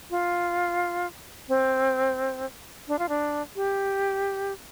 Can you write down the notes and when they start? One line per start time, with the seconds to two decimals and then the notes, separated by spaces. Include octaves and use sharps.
0.10 F4
1.49 C4
2.88 D4
2.99 F4
3.09 D4
3.56 G4